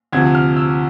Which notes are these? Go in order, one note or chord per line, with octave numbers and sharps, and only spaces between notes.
D2 C3 F3 G#6
F6
E6